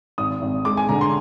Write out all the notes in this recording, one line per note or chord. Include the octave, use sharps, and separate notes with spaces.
G#1 D#6
G#1
G#3 D6
G#5
D3 A#5
C6